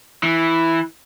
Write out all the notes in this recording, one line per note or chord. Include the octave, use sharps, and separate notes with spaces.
E3